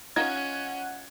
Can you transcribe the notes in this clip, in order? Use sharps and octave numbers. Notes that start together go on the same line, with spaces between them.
C#4 D#4 F4 D#5 F#5 G#6